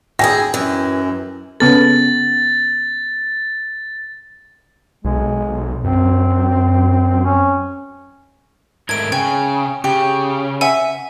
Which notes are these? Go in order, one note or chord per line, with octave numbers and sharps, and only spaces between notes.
D2 E4 G#4 G5 G#5 A#6
F#2 E3
C#3 B3 A4 A6
B1 G#3
F#2 C4
C#4
G#2 A3 A#4 G#6 D7
C#3 G5 G#5
C#3 G4
E5 F#5 G#5